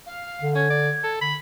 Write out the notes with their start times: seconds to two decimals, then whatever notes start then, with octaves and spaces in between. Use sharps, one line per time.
0.06 F5
0.41 D3
0.55 C#4 G#6
0.70 D5
1.04 A4
1.21 D3 B5